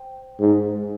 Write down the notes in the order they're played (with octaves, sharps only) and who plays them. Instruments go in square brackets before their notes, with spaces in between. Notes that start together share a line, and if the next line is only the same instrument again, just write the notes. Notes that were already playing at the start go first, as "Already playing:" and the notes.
Already playing: [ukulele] C5 G5
[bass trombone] G#2